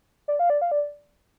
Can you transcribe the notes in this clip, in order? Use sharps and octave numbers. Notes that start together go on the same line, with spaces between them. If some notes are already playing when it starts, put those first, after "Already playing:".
D5
F5
D5
F5
D5